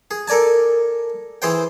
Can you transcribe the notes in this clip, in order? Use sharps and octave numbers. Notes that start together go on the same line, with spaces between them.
G#4
A4 A#4 D5 G#5 A5
E3 G#4 C5 G5